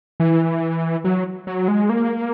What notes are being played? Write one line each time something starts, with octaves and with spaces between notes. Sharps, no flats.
E3
F#3
F#3
G#3
A#3